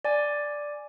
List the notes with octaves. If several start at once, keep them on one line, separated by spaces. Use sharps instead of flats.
D5 G#5